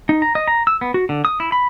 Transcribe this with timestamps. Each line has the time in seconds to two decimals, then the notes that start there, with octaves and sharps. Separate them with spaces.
0.09 D#4
0.22 A#5
0.35 D#5
0.48 A#5
0.67 E6
0.81 B3
0.94 F#4
1.09 D3
1.25 D#6
1.40 E4
1.52 B5